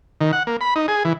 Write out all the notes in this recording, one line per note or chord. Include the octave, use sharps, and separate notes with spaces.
D#3
F#5
A#3
B5
D#4
G#4
E3